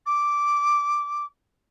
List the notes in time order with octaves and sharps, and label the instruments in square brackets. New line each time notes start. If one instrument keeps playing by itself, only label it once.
[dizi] D6